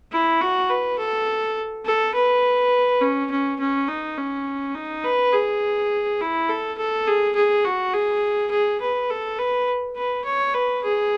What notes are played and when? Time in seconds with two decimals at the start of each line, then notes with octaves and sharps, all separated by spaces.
0.12 E4
0.41 F#4
0.70 B4
0.98 A4
1.86 A4
2.14 B4
3.01 C#4
3.31 C#4
3.60 C#4
3.88 D#4
4.18 C#4
4.75 D#4
5.04 B4
5.33 G#4
6.20 E4
6.49 A4
6.78 A4
7.07 G#4
7.36 G#4
7.65 F#4
7.94 G#4
8.51 G#4
8.81 B4
9.10 A4
9.39 B4
9.97 B4
10.25 C#5
10.54 B4
10.83 G#4